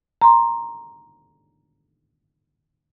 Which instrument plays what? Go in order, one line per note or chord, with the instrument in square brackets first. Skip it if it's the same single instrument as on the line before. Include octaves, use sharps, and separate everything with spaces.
[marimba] A#5 C6